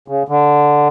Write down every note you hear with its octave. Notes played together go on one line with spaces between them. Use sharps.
C#3
D3